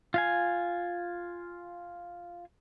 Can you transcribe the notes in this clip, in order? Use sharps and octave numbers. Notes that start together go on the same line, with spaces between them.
F4 F5 G#5